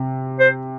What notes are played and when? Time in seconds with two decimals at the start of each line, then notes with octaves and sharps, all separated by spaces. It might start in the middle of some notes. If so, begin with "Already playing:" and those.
Already playing: C3
0.39 C5